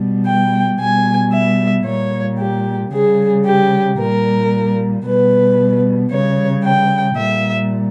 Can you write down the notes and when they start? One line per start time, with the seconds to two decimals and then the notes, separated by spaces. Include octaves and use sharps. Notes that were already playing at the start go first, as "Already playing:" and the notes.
Already playing: B2 G3
0.26 G5
0.80 B2 G3 G#5
1.33 E5
1.85 A#2 G3 C#5
2.39 G4
2.93 C#3 G3 G#4
3.45 G4
3.98 A#2 G3 A#4
5.05 B2 G3 B4
6.11 C#3 G3 C#5
6.64 G5
7.17 A#2 G3 E5